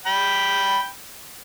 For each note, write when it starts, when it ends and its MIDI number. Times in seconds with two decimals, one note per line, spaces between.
0.06 0.88 79
0.06 0.88 83